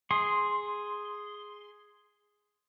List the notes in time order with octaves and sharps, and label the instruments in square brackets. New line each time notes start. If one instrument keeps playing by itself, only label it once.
[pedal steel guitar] G#4 C6